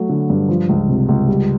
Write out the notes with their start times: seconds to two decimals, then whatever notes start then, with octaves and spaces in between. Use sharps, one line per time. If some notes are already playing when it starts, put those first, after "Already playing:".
Already playing: F#3 A3
0.09 D3
0.30 G2
0.49 F3
0.69 C#2
0.89 C3
1.09 C#2
1.28 G3